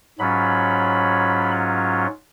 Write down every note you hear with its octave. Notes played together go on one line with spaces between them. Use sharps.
G#2 F#3 C#4 F4 B5